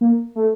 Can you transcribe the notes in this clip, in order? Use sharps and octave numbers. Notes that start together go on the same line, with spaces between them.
A#3
A3